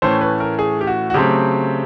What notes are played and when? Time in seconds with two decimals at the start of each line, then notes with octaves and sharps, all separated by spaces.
0.02 A2 E3 A3 C#4 C5
0.21 B4
0.40 A#4
0.59 G#4
0.81 G4
0.87 F#4
1.10 F#4
1.14 C#3 F#3 A3 C4 G4